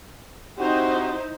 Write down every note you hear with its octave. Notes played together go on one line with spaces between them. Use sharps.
C4 D#4 E4 F#4 G4 C5